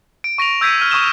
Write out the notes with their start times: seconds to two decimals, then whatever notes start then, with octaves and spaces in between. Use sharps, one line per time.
0.24 D7
0.38 C#6 A#6 D7 F7
0.61 E6 G6 G#6 B6 C#7 D#7
0.78 F6 D#7
0.90 C#6 D#6 E7 G7